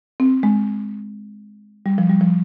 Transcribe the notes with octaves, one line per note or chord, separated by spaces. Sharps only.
C4
G#3
G3
F3
G3
F3